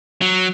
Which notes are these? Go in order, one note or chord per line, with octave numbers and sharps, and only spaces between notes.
F#3